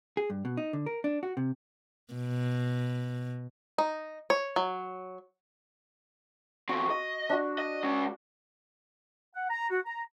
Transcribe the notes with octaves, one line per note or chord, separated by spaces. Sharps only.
G#4
G2
B2
D#4
D3
A#4
D4
F#4
C3
B2
D#4
C#5
F#3
E2 C4 F#4 C#6
D#5
D4 F#4
D#5
G#3 C#4
F#5
A#5
F#4
A#5